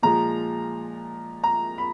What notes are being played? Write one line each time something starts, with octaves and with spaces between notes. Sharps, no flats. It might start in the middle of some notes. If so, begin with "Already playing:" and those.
A#2 F3 G#3 A#5
A#5
B5